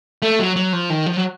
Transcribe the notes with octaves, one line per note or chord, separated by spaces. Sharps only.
A3
F#3
F#3
F3
D#3
F3
F#3